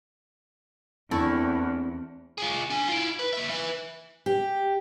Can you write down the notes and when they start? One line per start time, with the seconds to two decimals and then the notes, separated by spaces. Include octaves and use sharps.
1.11 E2 A3 C4 D4 E4 C#6
2.38 F4 G#4
2.70 D4 G#5
2.88 E4 F4
3.19 B4
3.33 A#3 E5
3.50 B4 E5
4.26 G4